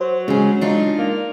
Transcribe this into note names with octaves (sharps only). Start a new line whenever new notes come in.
F#3 C5
C#3 G#3 G#4
D4 D#4 F4
A#3